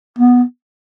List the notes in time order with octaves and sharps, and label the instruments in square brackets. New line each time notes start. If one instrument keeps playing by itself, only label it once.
[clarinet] B3